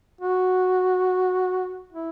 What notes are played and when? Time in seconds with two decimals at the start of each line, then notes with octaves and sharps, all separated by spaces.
0.21 F#4
1.93 E4